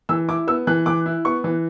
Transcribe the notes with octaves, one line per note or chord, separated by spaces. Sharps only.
E3 E6
E4 D6
B3 E6
E3 F#6
E3 D6
E4
B3 C#6
E3